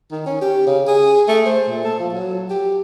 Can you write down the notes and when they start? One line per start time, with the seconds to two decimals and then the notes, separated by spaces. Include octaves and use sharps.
0.12 D#3
0.26 C#4
0.41 G4
0.67 C#3
0.88 G#4
1.28 A3
1.46 C5
1.68 A#2
1.85 A4
2.00 F3
2.14 F#3
2.50 G4